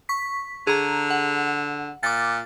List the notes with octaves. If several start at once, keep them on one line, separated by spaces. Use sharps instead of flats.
C#6 B6
D3 G#4 A#5
F#5
A#2 D6 A6